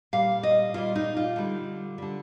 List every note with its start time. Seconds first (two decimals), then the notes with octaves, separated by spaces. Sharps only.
0.13 A#2 G3 F5
0.43 D#5
0.74 A#2 G3 F4
0.95 D#4
1.17 F4
1.36 D3 G3
1.98 D3 G3